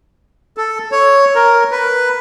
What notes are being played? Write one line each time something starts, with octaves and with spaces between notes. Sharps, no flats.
A4
C#5
A#4
B4